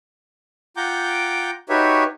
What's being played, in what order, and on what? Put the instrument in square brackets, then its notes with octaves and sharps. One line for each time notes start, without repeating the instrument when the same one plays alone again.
[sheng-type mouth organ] F4 F#5 G5 A#5 D6 G6
D#4 F#4 G4 B4 C#5 E5